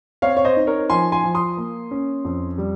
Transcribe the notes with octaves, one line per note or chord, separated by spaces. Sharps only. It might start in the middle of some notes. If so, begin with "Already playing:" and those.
C4 C#5 F5
C#5
C5 D#5
D#4
A#4 C#5
F3 G#5 C6
G#5 C6
F3
C6 D#6
A#3
C#4
F2
G3